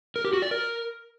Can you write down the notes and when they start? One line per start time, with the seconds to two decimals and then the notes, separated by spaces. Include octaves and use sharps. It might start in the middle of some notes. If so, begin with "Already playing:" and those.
0.16 A#4
0.25 G4
0.33 F#4
0.42 D5
0.51 A#4